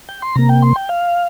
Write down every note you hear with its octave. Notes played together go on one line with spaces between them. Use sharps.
G5
C6
C3 A#3 A#5
G5
C6
G5
F5